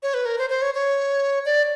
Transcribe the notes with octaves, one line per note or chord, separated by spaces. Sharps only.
C#5
B4
A#4
C5
C5
C#5
C#5
D5